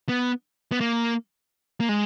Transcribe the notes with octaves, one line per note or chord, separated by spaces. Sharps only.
B3
B3
A#3
A#3
G#3